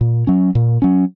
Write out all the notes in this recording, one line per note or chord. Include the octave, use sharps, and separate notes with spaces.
A#2
F#3 C#4
A#2
F#3 C#4